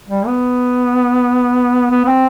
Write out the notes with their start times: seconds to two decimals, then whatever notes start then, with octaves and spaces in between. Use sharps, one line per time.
0.09 G3
0.27 B3
1.90 B3
2.04 B3
2.08 C4